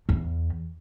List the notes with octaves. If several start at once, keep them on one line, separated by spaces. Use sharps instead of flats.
E2